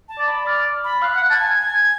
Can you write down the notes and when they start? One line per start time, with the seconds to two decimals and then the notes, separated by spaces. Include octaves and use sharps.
0.09 A5
0.18 D5
0.28 B5
0.46 D5 F6
0.84 B5
1.02 F5 F#6
1.16 F#5
1.30 A5 G#6
1.45 G#5